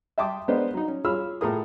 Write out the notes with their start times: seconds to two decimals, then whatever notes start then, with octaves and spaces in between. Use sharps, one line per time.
0.18 E5 G5 A5 C6 D6 D#6
0.48 G#3 B3 D4 A#4 C5 D#5
0.74 F#3 D#4
0.88 C#4
1.05 F4 G#4 C#5 B5 E6 F6
1.41 A2 F4 G#4 A#4 D#6